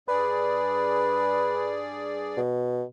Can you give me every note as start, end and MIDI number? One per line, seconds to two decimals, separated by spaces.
0.08 2.40 43
0.08 2.40 68
0.08 1.84 71
0.08 2.40 74
2.37 2.84 47